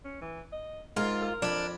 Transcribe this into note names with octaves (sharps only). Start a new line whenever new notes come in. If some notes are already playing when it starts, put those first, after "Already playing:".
C#4
E3
D#5
G#2 F4 A#4
A#4
F2 D4 B5